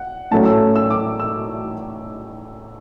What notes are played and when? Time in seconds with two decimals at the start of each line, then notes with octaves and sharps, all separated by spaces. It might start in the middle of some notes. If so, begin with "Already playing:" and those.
Already playing: F#5
0.31 A2 F#3 A3 C#4 A5
0.46 E6
0.76 E6
0.90 D6
1.20 E6